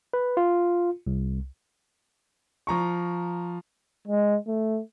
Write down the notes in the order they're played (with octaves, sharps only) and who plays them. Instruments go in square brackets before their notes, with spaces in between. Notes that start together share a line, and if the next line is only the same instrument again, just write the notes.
[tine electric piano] B4
F4
C2
[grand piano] F3 A#5 C#6
[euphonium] G#3
A3